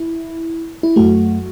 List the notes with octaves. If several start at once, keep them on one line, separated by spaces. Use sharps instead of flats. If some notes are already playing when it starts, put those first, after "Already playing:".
Already playing: E4
E4
F#2 F#3 A3 F#4